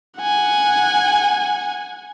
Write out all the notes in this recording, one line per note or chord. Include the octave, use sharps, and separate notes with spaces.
F#5 G#5